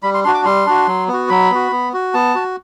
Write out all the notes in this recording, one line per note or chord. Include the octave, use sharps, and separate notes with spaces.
G3 B5
C6
D4 F#4 C6
D6
G3 C6
D4 F#4
F#3
B3
F#4
F#3 B5
B3 F#4
B3
F#4
B3 A5
F#4